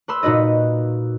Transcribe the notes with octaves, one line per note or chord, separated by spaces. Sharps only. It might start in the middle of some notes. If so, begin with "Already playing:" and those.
B4 B5 C6 E6
A#2 D#4 F#4 B4 D#5